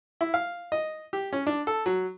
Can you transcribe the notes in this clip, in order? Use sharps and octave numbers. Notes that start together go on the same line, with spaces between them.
E4
F5
D#5
G4
C#4
D4
A4
F#3